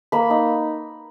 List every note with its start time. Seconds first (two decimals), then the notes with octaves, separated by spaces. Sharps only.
0.12 A#3 B5
0.30 D#4